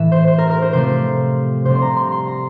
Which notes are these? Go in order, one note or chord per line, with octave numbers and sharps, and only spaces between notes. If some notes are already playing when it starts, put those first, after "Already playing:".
Already playing: A2 E3 A3 E5
C5
C5
A#4
A#4
C5
C3 F3 A3 C4 C5
C3 G3 C4 C5
C6
A#5
C6
C6
A#5